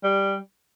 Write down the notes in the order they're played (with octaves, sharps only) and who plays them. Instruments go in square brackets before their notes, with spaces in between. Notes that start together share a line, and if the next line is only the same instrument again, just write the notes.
[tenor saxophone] G3